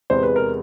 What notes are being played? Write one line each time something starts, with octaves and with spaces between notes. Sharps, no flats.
E2 C3 E3 G#3 C5
B4
A#4